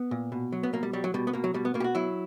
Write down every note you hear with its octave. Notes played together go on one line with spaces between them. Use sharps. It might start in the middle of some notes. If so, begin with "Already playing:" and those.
Already playing: B3
A#2
B2
F#3
B3
B2 A#3
G3
F#3 G3
F#3
B2 G3
B3
B2 A#3
F#3
B2 G3
B3
B2 A#3
G4
F#4
F#3 E4